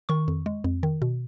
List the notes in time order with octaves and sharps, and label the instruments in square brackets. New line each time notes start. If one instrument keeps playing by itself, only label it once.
[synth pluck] D#3 C#6
F2
G#3
F2
D#3
B2